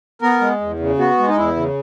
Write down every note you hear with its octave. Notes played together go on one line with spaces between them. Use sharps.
B3 A#4
G#3
E2
C#3
B3 F#4
G#3
D#4
E2 E4
C#3